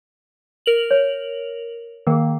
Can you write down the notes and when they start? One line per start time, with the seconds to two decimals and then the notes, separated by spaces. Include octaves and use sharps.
0.66 A#4 F7 F#7
0.91 C#5
2.07 D#3 A#3 G#4 A#4